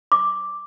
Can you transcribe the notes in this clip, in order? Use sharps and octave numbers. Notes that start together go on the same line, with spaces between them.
D6